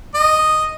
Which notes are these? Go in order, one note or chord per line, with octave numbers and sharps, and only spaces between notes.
D#5